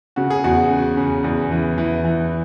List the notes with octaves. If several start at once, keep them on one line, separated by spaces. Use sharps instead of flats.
C#3 F#4
G#4
E2 F#4
C#3
C#3
E2
E3
E3
E3